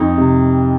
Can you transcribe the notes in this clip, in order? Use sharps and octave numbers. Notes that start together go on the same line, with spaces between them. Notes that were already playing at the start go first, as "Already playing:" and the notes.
Already playing: F2 D#4
C3